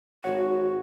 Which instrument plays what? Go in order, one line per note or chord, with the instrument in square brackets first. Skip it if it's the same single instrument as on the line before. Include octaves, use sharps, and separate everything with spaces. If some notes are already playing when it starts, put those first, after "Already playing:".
[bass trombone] G#1 [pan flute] F#4 [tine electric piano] C#5 F#5